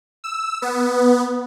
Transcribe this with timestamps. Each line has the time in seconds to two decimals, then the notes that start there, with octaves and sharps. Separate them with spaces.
0.24 E6
0.62 B3